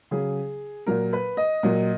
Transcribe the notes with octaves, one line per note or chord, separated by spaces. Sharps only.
C#3 F#3 G#4
A#2 F#3 A#4
B4
D#5
A#2 F#3